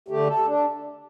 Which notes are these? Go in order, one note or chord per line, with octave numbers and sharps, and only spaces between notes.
D3 A3 G4
A4
D4